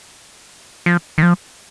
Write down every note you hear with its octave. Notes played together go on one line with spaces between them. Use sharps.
F3
D#3
F3